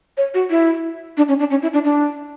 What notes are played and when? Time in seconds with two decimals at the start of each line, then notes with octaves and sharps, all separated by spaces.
0.17 C#5
0.34 F#4
0.50 E4
1.17 D4
1.29 C#4
1.39 D4
1.50 C#4
1.62 E4
1.73 D4
1.84 D4